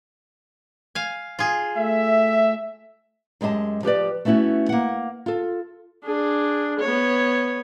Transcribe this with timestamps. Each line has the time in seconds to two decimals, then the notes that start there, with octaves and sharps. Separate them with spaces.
0.95 F5 G#5
1.39 F4 G#4
1.76 A3 E5
3.41 F#2 G#3 G4 D#5 A5
3.83 F3 G4 B4 D5
4.25 A3 B3 C#4 E4 F#4
4.69 A#3 F#5
5.26 F4 A4
6.04 D4 G#4
6.80 B3 C#5